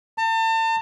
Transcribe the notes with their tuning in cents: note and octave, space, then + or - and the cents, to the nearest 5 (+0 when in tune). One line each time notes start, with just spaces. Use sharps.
A5 +40